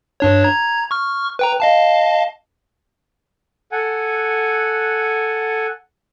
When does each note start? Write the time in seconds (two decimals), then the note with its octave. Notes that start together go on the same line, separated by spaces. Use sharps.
0.20 G2 D4 C#5
0.44 A#5 G#6
0.91 C#6 F6
1.39 B4 G5 A#5
1.60 D#5 F5 A5
3.72 A4 F#5 G#5